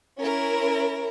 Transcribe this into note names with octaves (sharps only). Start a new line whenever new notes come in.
C#4 E4 A#4